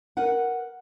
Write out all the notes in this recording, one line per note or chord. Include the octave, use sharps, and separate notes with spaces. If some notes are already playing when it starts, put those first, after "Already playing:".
A#4 B4 F#5